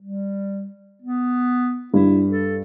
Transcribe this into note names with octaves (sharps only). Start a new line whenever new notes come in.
G3
B3
G2 E4
A4